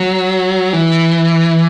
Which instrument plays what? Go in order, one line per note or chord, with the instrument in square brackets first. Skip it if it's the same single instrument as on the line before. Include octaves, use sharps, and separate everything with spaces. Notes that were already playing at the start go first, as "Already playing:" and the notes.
Already playing: [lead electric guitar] F#3
E3